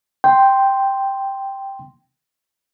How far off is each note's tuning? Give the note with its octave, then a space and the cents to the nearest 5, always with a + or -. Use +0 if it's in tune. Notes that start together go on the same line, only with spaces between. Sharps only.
G5 +0 C6 +0